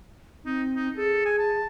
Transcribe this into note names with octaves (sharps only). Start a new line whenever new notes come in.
C4 D#4
D#4
G#4 A4
G#5
A5